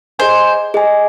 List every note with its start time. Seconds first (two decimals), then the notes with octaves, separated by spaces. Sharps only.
0.19 G#4 C5 D#5 G#5
0.74 G#4 D#5 G#5